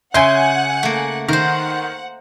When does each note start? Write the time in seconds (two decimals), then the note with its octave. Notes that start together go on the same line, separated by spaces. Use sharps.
0.14 C#3 E5 F#5 G#5 C6 G6
0.83 A3 A#3
1.28 D#3 A#4 C5 F#5